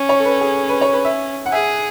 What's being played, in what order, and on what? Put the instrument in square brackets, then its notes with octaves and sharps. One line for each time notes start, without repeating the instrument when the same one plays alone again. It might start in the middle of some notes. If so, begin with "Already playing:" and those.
Already playing: [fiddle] C#4
[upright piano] C#5
A4
B4
G#4
B4
C#5
B4
E5
F#5
[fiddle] G#4 [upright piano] E5